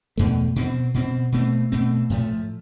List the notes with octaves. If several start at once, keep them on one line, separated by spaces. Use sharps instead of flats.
E2 B2 A3
B2 A3 C4
B2 A3 C4
B2 A3 C4
B2 A3 C4
A2 F3 A3